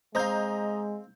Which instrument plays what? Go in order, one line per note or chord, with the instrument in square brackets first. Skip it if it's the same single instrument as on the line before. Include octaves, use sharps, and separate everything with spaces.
[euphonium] G#3 [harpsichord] C4 F5 [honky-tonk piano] D#5 A#5 G6